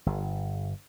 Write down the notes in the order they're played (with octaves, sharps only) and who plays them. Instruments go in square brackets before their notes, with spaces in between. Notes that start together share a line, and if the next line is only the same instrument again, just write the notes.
[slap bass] G1